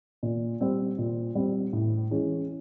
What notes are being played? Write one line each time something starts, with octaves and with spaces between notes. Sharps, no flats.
A#2
G3 C4
A#2
G3 C4
A2
E3 G#3 C#4